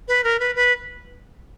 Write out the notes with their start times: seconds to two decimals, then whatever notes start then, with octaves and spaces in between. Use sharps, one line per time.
0.08 B4
0.24 A#4
0.40 B4
0.56 B4